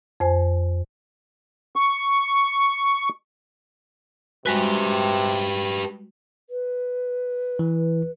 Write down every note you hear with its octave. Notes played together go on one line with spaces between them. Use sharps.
F2 C5 G#5
C#6
C3 G3 G#3 F#4 G4 B4
B4
E3